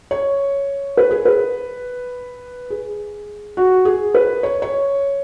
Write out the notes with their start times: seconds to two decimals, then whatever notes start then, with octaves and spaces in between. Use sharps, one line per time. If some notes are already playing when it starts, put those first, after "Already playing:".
0.11 C#5
0.97 B4
1.11 G#4
1.25 B4
2.70 G#4
3.57 F#4
3.85 G#4
4.14 B4
4.43 C#5
4.62 C#5